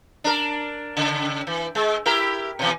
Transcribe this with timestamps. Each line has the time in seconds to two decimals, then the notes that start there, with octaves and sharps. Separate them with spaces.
0.24 D4 A#4
0.97 C#3
1.47 E3
1.75 G#3
2.06 E4 G4 A#4
2.59 B2 E3